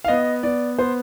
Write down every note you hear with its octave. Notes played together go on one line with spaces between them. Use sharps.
F5
B3 D#5
B3 D5
B3 C5